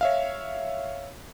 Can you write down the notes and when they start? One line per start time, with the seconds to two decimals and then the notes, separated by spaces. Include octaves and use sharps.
0.01 C#5 E5 F5